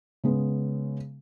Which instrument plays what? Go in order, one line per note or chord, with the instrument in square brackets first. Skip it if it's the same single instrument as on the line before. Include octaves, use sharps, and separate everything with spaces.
[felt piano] C#3 G#3 B3